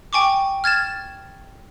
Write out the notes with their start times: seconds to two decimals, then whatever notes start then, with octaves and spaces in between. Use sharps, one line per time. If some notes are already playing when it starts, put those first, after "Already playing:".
0.13 G5 G#5 C#6 D6
0.64 F6 G#6 A6 E7